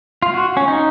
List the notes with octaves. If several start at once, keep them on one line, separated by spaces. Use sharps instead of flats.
F4
F#4
C#4
D#4